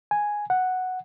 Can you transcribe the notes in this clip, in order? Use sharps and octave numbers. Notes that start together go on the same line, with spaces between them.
G#5
F#5